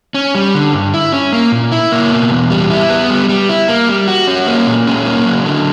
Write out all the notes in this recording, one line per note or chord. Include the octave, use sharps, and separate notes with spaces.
C#4
G3
D3
G2
E4
C#4
A#3
A#2
E4
A#3
B2
E2
G3
E4
B3
G3
G3
E4
A#3
G3
F#4
C#4
A#3
A#2
C#4
A#3
F#3
D3